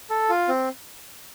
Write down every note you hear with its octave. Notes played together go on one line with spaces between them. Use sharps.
A4
F4
C4